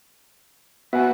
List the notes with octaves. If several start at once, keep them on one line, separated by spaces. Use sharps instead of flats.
B3 F#4 E5 F#5 G#5